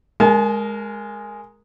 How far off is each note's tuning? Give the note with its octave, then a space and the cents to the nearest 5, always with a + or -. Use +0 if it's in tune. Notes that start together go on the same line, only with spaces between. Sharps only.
G#3 +0 A#4 +0 A5 -45